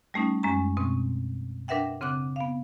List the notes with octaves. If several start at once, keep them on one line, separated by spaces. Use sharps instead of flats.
G3 A3 C#4 D#4
F#2 G#3 C#4 A#5
B2 C4 C#6
D4 A#4 B4 E5 F#5 G5
C#3 C4 F#5 D6 F#6
B3 F5